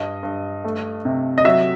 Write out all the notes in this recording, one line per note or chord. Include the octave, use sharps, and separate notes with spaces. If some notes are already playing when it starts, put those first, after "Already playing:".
Already playing: G2 D#5
G2
A3
C3
D#5
F#3 E5